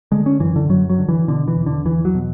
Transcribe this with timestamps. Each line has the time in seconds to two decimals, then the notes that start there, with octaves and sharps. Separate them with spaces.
0.12 D3 G#3
0.26 C#4
0.40 F#2 E3
0.56 D3
0.69 F#2 F#3
0.89 F#3
0.98 D3
1.09 E3
1.28 B2 D3
1.48 E3
1.57 E2
1.66 D3
1.85 E2 E3
2.05 F#3
2.15 B2